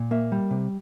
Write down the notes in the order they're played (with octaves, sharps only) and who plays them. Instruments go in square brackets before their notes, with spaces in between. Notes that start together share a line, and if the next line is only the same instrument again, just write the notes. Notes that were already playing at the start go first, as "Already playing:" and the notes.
Already playing: [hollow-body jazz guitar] A#2
A#3 E5
G3
C3